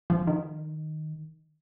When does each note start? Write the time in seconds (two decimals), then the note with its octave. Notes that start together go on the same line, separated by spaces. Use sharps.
0.10 F3
0.27 D#3